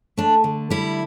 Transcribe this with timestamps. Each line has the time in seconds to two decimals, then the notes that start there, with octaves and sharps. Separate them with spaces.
0.17 A3 D4
0.44 D3
0.70 G3 E4